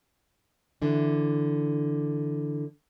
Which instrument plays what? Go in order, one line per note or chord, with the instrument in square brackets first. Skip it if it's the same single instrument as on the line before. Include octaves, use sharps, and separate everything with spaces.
[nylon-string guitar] D3 E3 D4